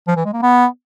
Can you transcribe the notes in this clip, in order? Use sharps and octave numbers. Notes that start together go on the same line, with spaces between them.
F3
E3
G#3
A#3
B3